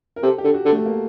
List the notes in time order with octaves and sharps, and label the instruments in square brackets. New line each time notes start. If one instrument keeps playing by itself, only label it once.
[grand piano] A#4
[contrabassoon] C3 [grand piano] A4
[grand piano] G4
[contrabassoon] D3
[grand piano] F#4
[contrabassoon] D3
[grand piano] A3
A#3